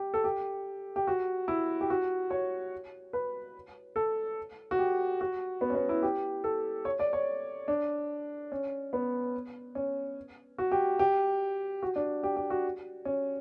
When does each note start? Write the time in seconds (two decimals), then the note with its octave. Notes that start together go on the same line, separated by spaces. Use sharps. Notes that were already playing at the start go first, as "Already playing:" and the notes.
Already playing: G4
0.14 A4
0.24 G4
0.96 G4
1.07 F#4
1.48 E4
1.81 G4
1.90 F#4
2.31 C#5
3.13 B4
3.96 A4
4.71 F#4
4.79 G4
5.21 F#4
5.61 B3
5.70 C#4
5.75 B3
5.89 E4
6.02 G4
6.44 A4
6.85 C#5
7.00 D5
7.13 C#5
7.68 D4
8.52 C#4
8.93 B3
9.75 C#4
10.58 F#4
10.72 G4
10.99 G4
11.83 F#4
11.96 D4
12.23 G4
12.36 G4
12.50 F#4
13.05 C#4